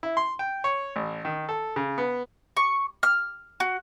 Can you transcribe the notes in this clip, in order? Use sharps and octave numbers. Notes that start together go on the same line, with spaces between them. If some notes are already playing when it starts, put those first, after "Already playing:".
E4
C6
G5
C#5
A1
D#3
A4
C#3
B3
C#6
F6
F#4